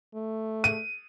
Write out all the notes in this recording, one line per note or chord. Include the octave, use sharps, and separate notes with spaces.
A3
D#7